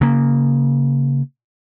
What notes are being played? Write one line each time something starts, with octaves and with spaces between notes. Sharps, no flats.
C#3 A#3